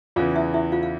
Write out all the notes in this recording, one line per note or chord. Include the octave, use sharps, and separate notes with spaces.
E2 C#3 E3 F4 F5
E4 E5
E4 E5
F4 F5
F5